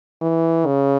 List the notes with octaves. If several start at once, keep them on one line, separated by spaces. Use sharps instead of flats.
E3
C#3